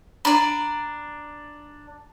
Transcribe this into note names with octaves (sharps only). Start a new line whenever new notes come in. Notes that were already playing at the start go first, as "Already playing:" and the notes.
D4 D5 A#5 B5